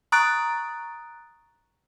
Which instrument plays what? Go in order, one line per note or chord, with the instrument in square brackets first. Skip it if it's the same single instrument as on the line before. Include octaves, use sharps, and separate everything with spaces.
[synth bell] A#5 C#6 D#6 F#6 A6 D7